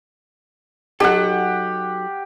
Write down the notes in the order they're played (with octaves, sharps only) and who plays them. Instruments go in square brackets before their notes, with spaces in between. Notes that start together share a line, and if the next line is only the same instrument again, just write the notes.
[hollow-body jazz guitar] F#3 D#4 A4 [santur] G4 F#5